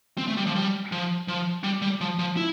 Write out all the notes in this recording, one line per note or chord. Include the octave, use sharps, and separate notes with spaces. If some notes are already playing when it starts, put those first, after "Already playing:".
C4
A3
G3
F3
G3
F3
F3
G3
G3
F3
F3
E4